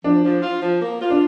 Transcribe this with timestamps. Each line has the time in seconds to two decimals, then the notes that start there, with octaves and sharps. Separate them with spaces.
0.04 F3 D4
0.23 F3
0.42 F4
0.61 F3
0.81 A#3
1.00 F4
1.10 D4